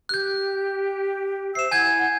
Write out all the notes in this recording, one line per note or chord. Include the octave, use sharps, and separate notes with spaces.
G4 F#6 G6
C5 E5 E6 C7 E7
E4 F#5 G#5 G6 G#6